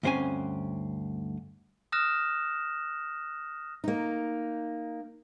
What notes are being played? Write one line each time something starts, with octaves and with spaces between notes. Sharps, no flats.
D2 G2 C4 C#4 G#5
D#6 F6 F#6 A#6 E7
A#3 D#4